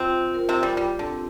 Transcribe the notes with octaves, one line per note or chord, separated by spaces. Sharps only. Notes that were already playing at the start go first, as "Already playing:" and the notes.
Already playing: C3 C4 F4 C5
F4
A#4
C3 C4
F4
G3
G3 G4
D3 C4